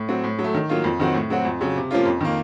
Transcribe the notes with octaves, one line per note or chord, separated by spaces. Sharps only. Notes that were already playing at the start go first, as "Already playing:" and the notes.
Already playing: A2
F#3 C4 F#4
A2
F#3
A3
D#3
F#3 A#3 F4
F2
D#3 F#3 C4 F#4
A2
F#3 C4 F#4
F2
C#3 F#3
C3
F3 A#3 C#4 F4
F2
D#3 A#3